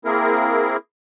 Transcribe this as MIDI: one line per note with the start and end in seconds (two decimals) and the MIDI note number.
0.05 0.77 58
0.05 0.77 60
0.05 0.77 64
0.05 0.77 68
0.05 0.77 70